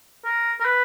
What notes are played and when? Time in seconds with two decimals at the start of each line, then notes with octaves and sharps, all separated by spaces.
0.25 A#4
0.60 A#4
0.65 B4